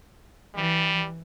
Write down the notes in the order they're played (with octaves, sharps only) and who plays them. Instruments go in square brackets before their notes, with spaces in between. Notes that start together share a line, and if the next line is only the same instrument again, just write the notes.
[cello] E3 [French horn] G3